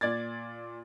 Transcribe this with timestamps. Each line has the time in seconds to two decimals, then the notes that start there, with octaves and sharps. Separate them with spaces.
0.01 A#2 D5 G#6 A6